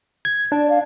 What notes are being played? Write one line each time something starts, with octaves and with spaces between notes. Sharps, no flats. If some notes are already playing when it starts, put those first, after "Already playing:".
G#6
D4 D5
F5